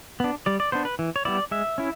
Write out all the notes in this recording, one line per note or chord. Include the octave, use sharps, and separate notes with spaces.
B3 D4
G3 D5
D5
B3 D4 C5
B4
E3
C#5
G3 B3 E4 D5
G#3 E5
C#4 E4